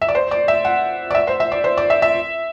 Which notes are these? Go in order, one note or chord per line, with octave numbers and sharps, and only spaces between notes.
E5
D5
C5
D5
E5
F#5
D5
E5
C5
E5
D5
C5
D5
E5
E5